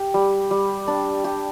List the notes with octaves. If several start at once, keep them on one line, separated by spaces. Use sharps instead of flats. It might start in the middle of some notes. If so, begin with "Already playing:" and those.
Already playing: G4
G3
G3
D4
G4